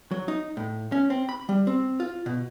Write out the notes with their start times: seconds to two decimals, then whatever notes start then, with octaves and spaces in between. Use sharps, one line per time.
0.11 F#3
0.28 D#4
0.57 A2
0.92 C#4
1.10 C4
1.29 B5
1.49 G3
1.67 C4
2.00 F4
2.26 B2